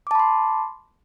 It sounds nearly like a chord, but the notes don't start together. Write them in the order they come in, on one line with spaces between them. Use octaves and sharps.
D6 A5 B5 C6